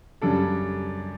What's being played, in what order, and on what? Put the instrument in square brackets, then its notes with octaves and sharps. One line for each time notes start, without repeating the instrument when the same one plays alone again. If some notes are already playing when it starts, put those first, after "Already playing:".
[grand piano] F#2 C#3 G3 D4 A4